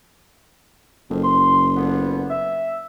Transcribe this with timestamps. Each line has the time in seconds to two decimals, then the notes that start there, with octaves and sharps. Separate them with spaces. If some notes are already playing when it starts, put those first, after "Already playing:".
1.10 F#1 F2
1.23 C6
1.76 D3 F3 B3
2.30 E5